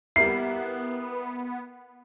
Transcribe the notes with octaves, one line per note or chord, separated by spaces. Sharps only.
G3 A#3 B3 E4 C7